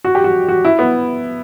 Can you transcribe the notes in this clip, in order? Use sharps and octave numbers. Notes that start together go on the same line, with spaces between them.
F#4
G4
F#4
F#4
E4
B3